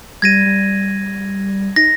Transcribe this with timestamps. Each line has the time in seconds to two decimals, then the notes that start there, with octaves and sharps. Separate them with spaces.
0.22 G3 G#6 A#6 D#7
0.46 G3
1.76 D#4 A#6